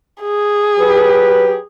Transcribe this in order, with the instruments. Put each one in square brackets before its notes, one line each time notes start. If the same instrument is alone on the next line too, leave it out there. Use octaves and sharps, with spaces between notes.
[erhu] G#4
[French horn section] F#3 G4 B4